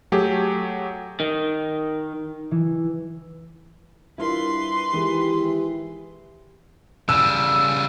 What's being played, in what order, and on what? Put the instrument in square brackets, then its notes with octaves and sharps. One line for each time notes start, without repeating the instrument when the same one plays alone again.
[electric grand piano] F#3 A3 G4 G#4
[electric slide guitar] D#3
[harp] E3
[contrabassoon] G2 [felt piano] E4 F4 A#4 [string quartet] B4 C6
[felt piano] D#3 G#3 [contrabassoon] E3 [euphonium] G4
[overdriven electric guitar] C#3 G3 [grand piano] E6